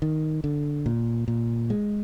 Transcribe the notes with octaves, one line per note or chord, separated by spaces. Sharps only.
D#3
D3
A#2
A#2
G#3